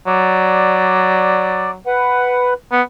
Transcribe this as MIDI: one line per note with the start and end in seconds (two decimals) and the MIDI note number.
0.07 1.77 54
0.07 1.71 74
1.86 2.54 71
1.86 2.54 78
2.72 2.82 59